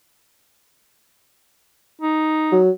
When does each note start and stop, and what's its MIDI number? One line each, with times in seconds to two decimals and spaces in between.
2.02 2.60 63
2.52 2.70 54